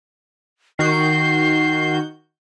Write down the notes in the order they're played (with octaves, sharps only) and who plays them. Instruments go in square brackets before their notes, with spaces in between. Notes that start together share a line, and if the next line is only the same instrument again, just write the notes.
[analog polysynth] D#3 F#4 G6 [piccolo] C7